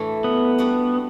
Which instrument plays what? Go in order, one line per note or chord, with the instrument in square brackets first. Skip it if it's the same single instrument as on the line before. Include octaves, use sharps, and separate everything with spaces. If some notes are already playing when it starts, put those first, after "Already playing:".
Already playing: [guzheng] A2 E3 A3 D4 F#4
[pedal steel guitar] B3
[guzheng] G3 D4 F#4